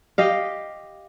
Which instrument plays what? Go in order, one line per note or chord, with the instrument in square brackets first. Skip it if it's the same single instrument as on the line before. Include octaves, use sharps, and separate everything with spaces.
[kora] G4 D#5 F5